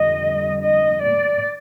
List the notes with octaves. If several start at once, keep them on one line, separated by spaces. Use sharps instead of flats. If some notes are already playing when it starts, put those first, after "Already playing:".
Already playing: F2 D3 G3 D#5
D#5
D5